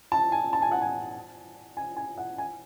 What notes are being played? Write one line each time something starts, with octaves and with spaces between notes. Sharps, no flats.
A5
G#5
A5
G#5
F#5
G#5
G#5
G#5
F#5
G#5